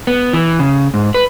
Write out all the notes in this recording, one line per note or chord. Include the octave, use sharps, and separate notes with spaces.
B3
E3
C#3
G#2
B4